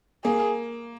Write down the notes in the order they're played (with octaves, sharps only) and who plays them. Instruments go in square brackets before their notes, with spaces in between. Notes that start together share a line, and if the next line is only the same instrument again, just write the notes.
[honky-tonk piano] A#3 [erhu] G#4